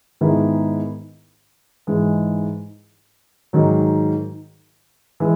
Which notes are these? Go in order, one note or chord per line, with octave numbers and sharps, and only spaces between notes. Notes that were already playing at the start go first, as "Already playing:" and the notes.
G#2 D#3 G#3 B3 E4
G#2 E3 G#3
G#2 D#3 F#3
E3 G#3